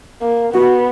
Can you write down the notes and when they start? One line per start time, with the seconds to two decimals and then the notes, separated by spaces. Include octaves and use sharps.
0.22 A#3
0.53 B3 F#4